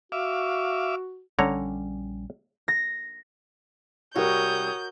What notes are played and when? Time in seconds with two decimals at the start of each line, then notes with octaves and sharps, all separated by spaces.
0.12 F#4 E5 F5 D6
1.39 A#1 D3 G3 C#4 C#5 A#5
2.68 A#6
4.16 C2 F#4 A#4 C#5 D#6 G6